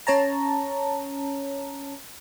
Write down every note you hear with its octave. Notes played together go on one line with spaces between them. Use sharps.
C#4 C#5 A5 A#5